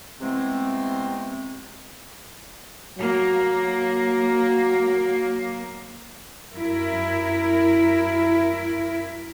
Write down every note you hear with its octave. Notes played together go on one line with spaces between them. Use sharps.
C3 E3 G#3 A3 B3 C4
F#3 A#3
F#2 E4 A#4